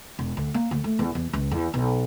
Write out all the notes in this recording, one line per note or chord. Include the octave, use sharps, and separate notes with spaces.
E1
D2
A#3
D2
A3
E2
E2
C#2
E2
B1